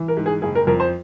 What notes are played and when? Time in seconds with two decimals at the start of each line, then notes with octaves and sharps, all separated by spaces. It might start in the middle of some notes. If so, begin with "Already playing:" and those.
Already playing: E3
0.08 A#4
0.17 G#2
0.26 G#4
0.42 F#1 G#4
0.55 A#4
0.67 F2 A#4
0.80 C5